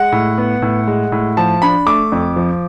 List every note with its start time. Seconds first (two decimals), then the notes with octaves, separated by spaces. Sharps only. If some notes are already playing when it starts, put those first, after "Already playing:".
Already playing: G#3 F#5
0.12 A2
0.38 B3
0.62 A2
0.88 G#3
1.12 A2
1.37 F3 A5
1.62 D4 B5
1.86 A3 D6
2.12 F2
2.36 F3